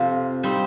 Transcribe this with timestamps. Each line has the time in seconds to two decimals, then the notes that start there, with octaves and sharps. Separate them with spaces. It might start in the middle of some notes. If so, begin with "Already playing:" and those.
Already playing: F2 C3 F3
0.43 G3 C4 D#4